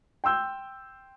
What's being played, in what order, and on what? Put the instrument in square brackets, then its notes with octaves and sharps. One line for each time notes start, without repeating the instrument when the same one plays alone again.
[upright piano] G5 C6 E6 G6